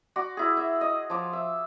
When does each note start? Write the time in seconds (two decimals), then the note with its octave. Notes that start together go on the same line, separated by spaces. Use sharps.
0.16 F#4 D5 D6
0.37 E4 G#4
0.57 E5
0.81 D#5
1.10 F3 D6
1.33 E5